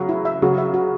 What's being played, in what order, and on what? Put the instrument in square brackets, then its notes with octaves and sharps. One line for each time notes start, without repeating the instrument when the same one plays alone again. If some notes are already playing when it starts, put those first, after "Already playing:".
Already playing: [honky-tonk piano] C#3 F#3 [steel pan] F#4
[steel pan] E4
E5
[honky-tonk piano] C#3 F#3 [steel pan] F#4
[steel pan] E5
F#4